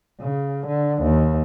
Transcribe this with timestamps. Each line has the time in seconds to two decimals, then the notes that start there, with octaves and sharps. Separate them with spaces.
0.21 C#3
0.67 D3
1.03 D#2